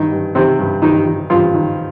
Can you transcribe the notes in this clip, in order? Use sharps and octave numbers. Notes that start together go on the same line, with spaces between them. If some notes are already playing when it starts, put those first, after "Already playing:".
Already playing: G2 D#3 D#4
G2
C3 D#3 C4
G2
G2 D#3 D#4
D#3
G2 F3 F4
D#3